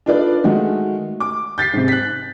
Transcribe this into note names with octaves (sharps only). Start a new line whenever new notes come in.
D4 D#4 F4 A4 B4 D5
D#3 G#3 A3 F#4
D6
G6 A6 B6 C7
G#2 C3
F#6 B6